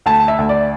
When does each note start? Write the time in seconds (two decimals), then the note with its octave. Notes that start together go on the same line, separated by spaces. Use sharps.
0.06 D2 A5
0.28 E5
0.38 D2
0.49 D5